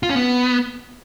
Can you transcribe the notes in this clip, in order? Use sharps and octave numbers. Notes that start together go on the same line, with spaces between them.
F4
C#4
B3